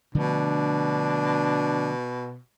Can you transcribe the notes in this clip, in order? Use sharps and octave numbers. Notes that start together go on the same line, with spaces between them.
B2 D3 F3 A3 D4